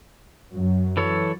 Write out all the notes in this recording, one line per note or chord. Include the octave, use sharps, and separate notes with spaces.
F#2 F#3
E3 A4 C#5